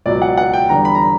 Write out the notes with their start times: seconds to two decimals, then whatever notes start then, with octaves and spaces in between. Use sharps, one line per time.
0.06 C#2 B2 F#3 D5
0.22 F#5
0.37 F#5
0.53 G5
0.69 E2 D3 G3 A#5
0.85 B5
0.95 A#5